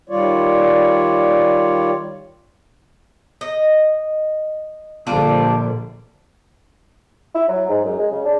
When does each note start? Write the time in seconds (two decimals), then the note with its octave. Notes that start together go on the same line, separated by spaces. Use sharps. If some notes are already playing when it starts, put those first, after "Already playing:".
0.09 D#3 G3 F4 C#5 D5
3.41 D#5
5.07 A#1 D3 G3 D4 F4
7.35 E4
7.48 F#3
7.69 G#2
7.85 F#2
7.98 G#3
8.12 C#3
8.25 D4